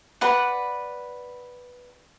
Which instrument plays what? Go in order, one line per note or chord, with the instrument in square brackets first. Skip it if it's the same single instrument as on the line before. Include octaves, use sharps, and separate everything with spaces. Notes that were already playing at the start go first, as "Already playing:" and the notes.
[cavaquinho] B4 D5 F#5